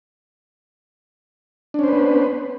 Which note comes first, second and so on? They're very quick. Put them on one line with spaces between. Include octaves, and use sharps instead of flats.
D4 C#4 C5 B4 B3